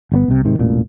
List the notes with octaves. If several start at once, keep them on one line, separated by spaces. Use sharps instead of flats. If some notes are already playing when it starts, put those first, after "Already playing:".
G1 D3 B3
C2 C3
G#2 C3 D#3
E1 A1 A#2